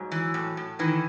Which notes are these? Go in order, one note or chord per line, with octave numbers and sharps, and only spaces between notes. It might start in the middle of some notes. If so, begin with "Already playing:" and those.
Already playing: G#2 F#3
E3
A2
A2
D#3 E3